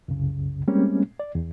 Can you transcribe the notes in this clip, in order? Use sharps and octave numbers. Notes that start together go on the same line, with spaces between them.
C2 F#2 C#3
G3 G#3 A#3 C4 C#4
D5
E2